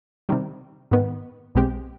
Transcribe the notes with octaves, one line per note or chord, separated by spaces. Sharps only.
C3 D#3 G3
G#2 D#3 B3
B1 B2 G#3 C4 G4